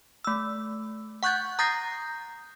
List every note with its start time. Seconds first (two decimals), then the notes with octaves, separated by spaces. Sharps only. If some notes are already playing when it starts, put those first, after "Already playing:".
0.25 A3 E6
1.23 F#5 C#6 F#6 G6 A6
1.59 A#5 D#6 G6 A6 A#6 C7